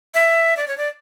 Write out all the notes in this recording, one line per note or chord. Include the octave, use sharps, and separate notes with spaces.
E5
D5
C#5
D5